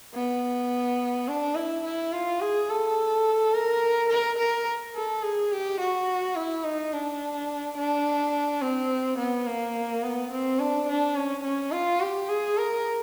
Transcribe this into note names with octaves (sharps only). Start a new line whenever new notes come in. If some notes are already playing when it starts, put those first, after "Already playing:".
B3
D4
E4
E4
F4
G#4
A4
A#4
A#4
A#4
A4
G#4
G4
F#4
E4
D#4
D4
D4
C4
B3
A#3
B3
C4
D4
D4
C#4
C#4
F4
G4
G#4
A#4